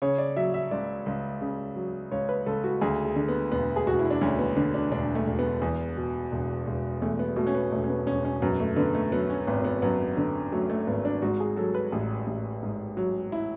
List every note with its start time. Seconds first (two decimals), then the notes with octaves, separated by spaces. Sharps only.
0.02 C#3 C#5
0.18 D5
0.37 F#3 E5
0.54 E5
0.71 C#2 D5
1.06 C#2
1.41 C#3
1.76 F#3
2.11 C#2 C#5
2.29 B4
2.46 C#2 A4
2.64 F#4
2.81 D2 G#4
3.05 G#4
3.16 D3
3.28 B3
3.52 E1 B3
3.76 G#4
3.87 E1 F#4
3.99 E4
4.10 D4
4.21 D2 C#4
4.39 B3
4.57 D3 B3
4.74 D4
4.91 E1 D4
5.15 A3
5.27 E1
5.39 B3
5.62 E2
5.97 B2
6.32 E1
6.67 E1
7.02 E2 A3
7.19 B3
7.36 B2 A3
7.47 C#4
7.55 B3
7.71 E1 A3
7.84 C#4
7.89 B3
8.06 E1 C#4
8.25 C#4
8.42 F#2 B3
8.60 A3
8.76 D3 B3
8.95 A3
9.12 F#3 B3
9.30 C#4
9.47 G#1 B3
9.64 B3
9.82 F#2 B3
10.17 D3 B3
10.52 F#3 A3
10.70 A3
10.87 G#1 B3
11.05 D4
11.22 G#2 F#4
11.40 G#4
11.57 F#3 A4
11.75 B4
11.92 A1
12.27 A1
12.63 G#2
12.97 F#3
13.32 E4